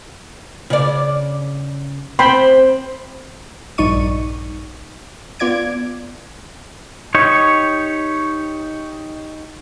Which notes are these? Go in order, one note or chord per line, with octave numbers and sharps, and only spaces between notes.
C#3 D5
C4 G5 B5 C6
A#1 G2 D#4 D5 C#6 D#7
B3 F4 D5 G#6 D7
D#4 G4 C#5